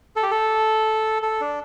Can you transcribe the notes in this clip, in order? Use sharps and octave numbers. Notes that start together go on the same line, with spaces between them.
A4
G4
A4
A4
D4